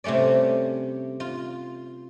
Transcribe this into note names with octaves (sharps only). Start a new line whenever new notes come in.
C3 G3 A3 C#4 D5
F4